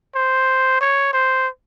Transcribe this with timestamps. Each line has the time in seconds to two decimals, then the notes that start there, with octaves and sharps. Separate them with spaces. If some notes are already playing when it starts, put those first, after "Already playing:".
0.15 C5
0.81 C#5
1.13 C5